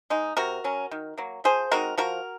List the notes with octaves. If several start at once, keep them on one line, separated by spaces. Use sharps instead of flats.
G#3 D#4
C3 F#4 A#4
F#3 C#4
D#3
F#3 A#3
F3 G#4 C5
G#3 C4 D#4 F#4 A#4
F3 F#4 A#4